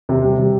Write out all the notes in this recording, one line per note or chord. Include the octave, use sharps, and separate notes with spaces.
C3
G3
C3